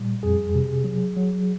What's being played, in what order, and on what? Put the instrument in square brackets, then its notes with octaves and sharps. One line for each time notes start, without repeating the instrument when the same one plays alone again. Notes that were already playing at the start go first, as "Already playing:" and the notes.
Already playing: [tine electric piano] A#2 G3
F2 G#4
C3
F#3
F#3